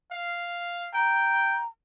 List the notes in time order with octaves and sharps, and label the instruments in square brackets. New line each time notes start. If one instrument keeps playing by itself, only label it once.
[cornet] F5
[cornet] G5 [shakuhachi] A#5